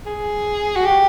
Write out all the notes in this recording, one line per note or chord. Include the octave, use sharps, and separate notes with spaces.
G#4
F#4
G4